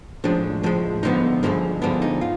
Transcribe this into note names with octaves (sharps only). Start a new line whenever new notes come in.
A2 F3 G#3 D4
A2 F3 G#3
G2 D3 F3 G#3 B3 D#4
G2 D3 F3 G#3 B3
G2 D3 F3 G#3 B3 D4
D#4
F4